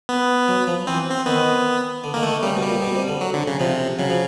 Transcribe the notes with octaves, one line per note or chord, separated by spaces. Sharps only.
B3
F#3
F3
E3 C4
C4
D#3 B3
D3
D#3 A#3
A3
D3
C#3 G3
B2
G3
A#2
B2
C3
D3
F#3
D3
C#3
C3 F3
C#3 F#3
F3